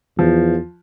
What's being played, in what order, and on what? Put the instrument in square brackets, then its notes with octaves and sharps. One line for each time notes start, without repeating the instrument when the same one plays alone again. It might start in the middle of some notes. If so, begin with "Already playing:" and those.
[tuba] E2 [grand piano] F3